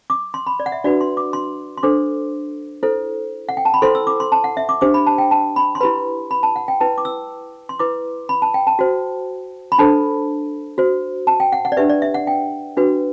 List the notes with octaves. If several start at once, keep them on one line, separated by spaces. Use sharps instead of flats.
D6
C6
B5
D5
F#5
E5
D4 F#4 B4 D5
C6
D6
C6
C6
D4 A4 C5 D6
E4 A4 C5
F#5
G5
A5
B5
E4 A4 C5 C6
E6
D6
C6
A5
F#5
E5
D6
D4 G4 C5 D6
B5
A5
G5
A5
B5
C6
E4 G4 B4 B5
B5
A5
F#5
G5
E4 B4 A5
D6
E6
C6
E4 B4 D6
B5
A5
G5
A5
F#4 C5
B5
D4 A4 C5 A5
F#4 C5
A5
G5
F#5
F#5
D5
D4 G4 B4 E5
D5
E5
F#5
G5
D4 F#4 B4